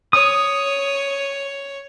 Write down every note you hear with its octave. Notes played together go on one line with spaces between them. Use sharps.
C#5 D#6